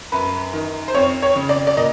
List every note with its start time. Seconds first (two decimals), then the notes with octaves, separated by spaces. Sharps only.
0.12 F#2 B4
0.53 D#3
0.88 C5
0.94 F2 C#5
1.22 C#5
1.36 C#3
1.49 D5
1.67 D5
1.77 A#2 D#5